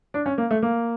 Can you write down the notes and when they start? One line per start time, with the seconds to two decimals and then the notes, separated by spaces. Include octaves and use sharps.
0.14 D4
0.26 C#4
0.38 A#3
0.51 A3
0.62 A#3